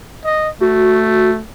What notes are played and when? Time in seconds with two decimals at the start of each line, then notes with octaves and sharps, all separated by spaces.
0.25 D#5
0.61 A3 F#4